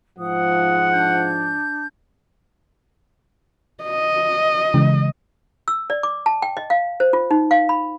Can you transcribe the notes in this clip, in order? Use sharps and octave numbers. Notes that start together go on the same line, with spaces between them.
G#2 F3 F#5 D#6
D4 G6
D#5
C#3 E3 G#3
E6
D5
D6
A5
G5
D#5
F5
C5
F4
D#4
F5
B5